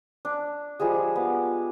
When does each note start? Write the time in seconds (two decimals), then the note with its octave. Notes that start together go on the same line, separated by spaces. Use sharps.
0.25 D4
0.80 F3 G3 G#3 G#4
1.16 B3